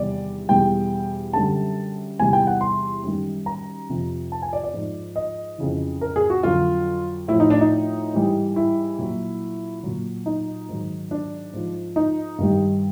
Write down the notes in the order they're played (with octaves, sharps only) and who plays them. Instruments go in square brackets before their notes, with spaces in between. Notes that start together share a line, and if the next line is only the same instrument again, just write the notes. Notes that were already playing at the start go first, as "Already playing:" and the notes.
Already playing: [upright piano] E2 C3 D#3 G3 D5
E2 B2 G3 G5
F#2 D3 G3 A5
E2 C3 E3 G3 G#5
G5
F#5
C6
F#2 D#3 G3
A#5
F2 C3 F3
A5
G#5
D5
D5
G#2 F3
D#5
F2 C#3 E3
A#4
G#4
F#4
F2 D3 F#3 F4
A2 E4
F3
D#4
D4
D#4
G#2 E3 G3
E4
A#2 F#3
A#2 F#3
D#4
G#2 D#3 F#3
D4
G#2 F3
D#4
G2 D#3 G3